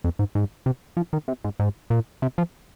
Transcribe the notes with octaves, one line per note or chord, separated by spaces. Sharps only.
F2
G#2
G#2
C3
F3
D#3
C3
G#2
G#2
A#2
C3
F3